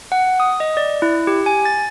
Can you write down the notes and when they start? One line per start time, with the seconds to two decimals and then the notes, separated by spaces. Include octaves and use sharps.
0.12 F#5
0.40 D#6
0.60 D#5
0.77 D5
1.02 E4
1.27 G4
1.46 G#5
1.65 A6